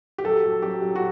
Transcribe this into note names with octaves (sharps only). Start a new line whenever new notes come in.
G4
F#3 A4
F#3
F#3 G4
F#3
F#4